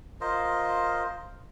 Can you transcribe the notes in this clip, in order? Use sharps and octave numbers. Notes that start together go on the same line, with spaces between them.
F4 A#4 C5 D#5